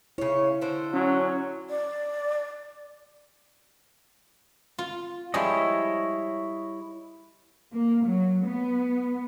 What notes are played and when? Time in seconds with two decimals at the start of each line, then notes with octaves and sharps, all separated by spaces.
0.18 C#3 E4 C#5
0.61 D3 C5
0.93 F#3 C#4
1.70 D5
4.79 F4
5.34 F3 G3 G#3 E4 C#5 D#5
7.73 A#3
8.05 F#3
8.46 B3